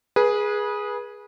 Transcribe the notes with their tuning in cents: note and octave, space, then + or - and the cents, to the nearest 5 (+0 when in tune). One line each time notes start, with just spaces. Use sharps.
G#4 +0 B4 -30